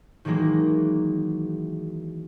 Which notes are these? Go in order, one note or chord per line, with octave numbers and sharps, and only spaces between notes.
D#3 E3 F#3 G#3 A#3